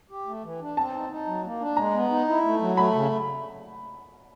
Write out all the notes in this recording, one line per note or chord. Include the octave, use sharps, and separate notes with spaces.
G4
A3
E3
D4
C4 A5
D#4
D#4
F#3
A#3
D4
G#3 A#5
B3
D#4
E4
A3
F#3
A3 B5
C#3